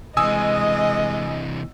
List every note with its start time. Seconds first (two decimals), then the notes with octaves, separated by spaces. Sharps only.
0.17 C3 E3 G#3 D#5 G#5 D#6 E6